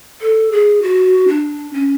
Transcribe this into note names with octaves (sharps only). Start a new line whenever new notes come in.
A4
G#4
F#4
D4
C#4